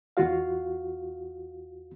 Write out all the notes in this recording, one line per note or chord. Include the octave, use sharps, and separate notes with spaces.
E2 F4 F#4 F5